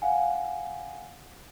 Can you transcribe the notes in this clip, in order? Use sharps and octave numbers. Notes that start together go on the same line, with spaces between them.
F5 F#5 G#5